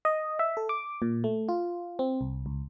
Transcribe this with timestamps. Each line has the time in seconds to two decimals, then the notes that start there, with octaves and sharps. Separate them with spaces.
0.05 D#5
0.39 E5
0.57 A4
0.69 D6
1.02 A#2
1.24 A3
1.49 F4
1.99 C4
2.21 C2
2.46 C#2